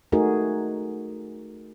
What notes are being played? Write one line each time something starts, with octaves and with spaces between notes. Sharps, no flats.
A3 D#4 F#4 G#4 A#4